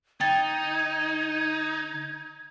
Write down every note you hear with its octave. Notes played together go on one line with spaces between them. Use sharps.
D3 D#4 G5 G#6 A6